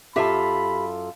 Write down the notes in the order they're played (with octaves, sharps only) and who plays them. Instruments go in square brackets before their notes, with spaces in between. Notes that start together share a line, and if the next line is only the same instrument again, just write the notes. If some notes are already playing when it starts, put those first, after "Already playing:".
[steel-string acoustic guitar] F#2 F4 A4 [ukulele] G4 E5 [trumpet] B5